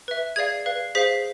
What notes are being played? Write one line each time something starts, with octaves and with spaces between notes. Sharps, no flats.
B4 E5
G#4 D5 F5 G#6
B4 F5
G#4 C5 F5 B6